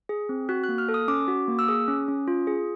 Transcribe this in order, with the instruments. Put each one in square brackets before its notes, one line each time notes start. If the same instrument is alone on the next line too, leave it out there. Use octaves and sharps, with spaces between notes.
[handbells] G#4
C4
F#4 F#6
F#6
A#3
F6
A4
D#6
C#4 D6
F#4
A#3
E6
G#4 D#6
C#4
C#4
F4
G#4